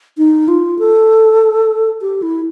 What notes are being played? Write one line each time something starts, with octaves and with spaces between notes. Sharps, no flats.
D#4
F4
A4
G4
E4